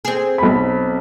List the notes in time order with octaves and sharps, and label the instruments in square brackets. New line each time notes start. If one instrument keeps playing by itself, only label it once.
[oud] C4 G#4
[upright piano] B1 B5